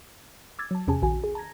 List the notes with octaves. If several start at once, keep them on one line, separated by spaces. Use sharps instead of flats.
D6 E6 G#6 A6
F#3 A5
E2 C3 C#4 G#4 G#5 A5
A#1 D#3 F#4 G#5
G#4
A5 A#5 G#6 A#6